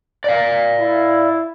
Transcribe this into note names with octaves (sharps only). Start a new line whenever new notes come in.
D5 F5
E4